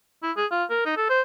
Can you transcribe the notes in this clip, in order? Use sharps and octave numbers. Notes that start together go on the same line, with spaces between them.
E4
G#4
F4
A#4
D#4
A4
C5